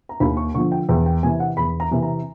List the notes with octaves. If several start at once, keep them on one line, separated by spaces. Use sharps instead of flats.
A#5
D#2 B5
C#6
D3 F3 C#6
G5
E2 G5
G5
C3 E3 G#5
F#5
E2 B5
A#5
C3 E3
A#5